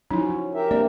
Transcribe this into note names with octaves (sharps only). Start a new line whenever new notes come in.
F3 F#3 C#4 D#4 E4
G4 A#4 E5
A#3 C4 D4 D5